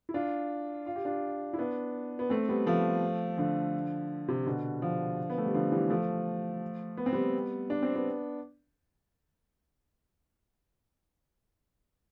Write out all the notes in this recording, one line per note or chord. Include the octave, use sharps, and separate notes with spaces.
E4
D4 F4
F4
G4
D4 F4
E4
B3 D4
B3
A3 C4
G3 B3
F3 A3
D3 F3
C3
B2 D3
D3 F3
B3
A3
G3
D3 F3
E3 G3
F3 A3
B3
C4
G3 B3
D4
C4
B3 D4